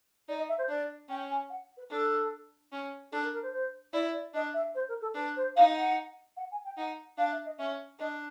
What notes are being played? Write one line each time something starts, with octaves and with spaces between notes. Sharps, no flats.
D#4 D5
D#5
E5
C5
D4 D5
C#4 G5
G#5
F#5
B4
D4 A4
C#4
D4 A4
A#4
A#4
C5
C5
E4 D5
D5
D4 D#5
E5
C5
A#4
A4
D4 B4
C5
D#4 F5
F#5
F#5
G#5
G5
D#4 F#5
D4 F5
E5
D#5
C#4 E5
D4 D#5